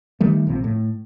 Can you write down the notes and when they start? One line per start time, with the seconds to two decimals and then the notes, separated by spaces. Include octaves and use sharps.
0.21 D#3 G3 A3
0.47 A#1 C3 F3
0.64 A2